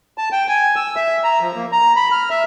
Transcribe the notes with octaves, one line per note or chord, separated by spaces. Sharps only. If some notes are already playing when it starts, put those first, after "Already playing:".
A5
G5
G#5
E6
E5
A#5
F3
A#3
A#5
B5
F6
E5